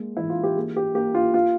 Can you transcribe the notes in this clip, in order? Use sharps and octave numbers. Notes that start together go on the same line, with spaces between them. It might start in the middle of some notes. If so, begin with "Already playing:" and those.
Already playing: G#3 A#3
E3 E4
F4
G4
A#3 G#4
G4
A#3 G4
F4
F4